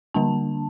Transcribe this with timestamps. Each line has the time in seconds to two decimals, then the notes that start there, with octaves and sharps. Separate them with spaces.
0.14 D3 G3 A#3 D4 A5